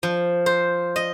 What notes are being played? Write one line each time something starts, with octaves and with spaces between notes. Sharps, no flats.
F3
C5
D#5